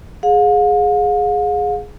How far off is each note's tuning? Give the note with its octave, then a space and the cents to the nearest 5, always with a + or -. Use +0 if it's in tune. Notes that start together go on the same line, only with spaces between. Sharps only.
G#4 +0 F5 +45